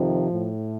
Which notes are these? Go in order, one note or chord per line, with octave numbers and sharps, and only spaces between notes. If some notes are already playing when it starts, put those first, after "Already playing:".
Already playing: F2 C3 D#3 F3
A2